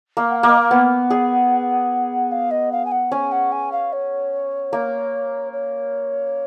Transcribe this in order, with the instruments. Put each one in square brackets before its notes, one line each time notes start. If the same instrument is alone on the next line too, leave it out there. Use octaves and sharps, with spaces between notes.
[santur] A#3
[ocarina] F#5
F5
[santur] A#3
[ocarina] D#5
F5
[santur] B3 [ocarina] F#5
[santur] G#4
[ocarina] F5
D#5
F5
G#5
F#5
[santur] C#4 [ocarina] G#5
[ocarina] F#5
G#5
F5
C#5
[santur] A#3
[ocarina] C#5